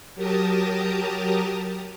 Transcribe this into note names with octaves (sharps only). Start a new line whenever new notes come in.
F#3 G4 A#4 A5 A#5 D#6